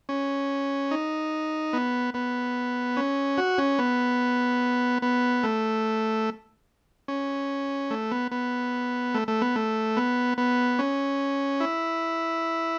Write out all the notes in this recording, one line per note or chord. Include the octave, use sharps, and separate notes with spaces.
C#4
D#4
B3
B3
C#4
F#4
C#4
B3
B3
A3
C#4
A3
B3
B3
A3
A3
B3
A3
B3
B3
C#4
E4